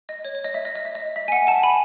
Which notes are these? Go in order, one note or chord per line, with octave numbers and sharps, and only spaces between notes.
D#5
C#5
C#5
D#5
E5
D#5
D#5
E5
D#5
E5
G#5
F#5
F#5 A5
G#5 B5